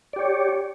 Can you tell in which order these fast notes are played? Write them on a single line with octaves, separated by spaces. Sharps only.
D5 G4 C#5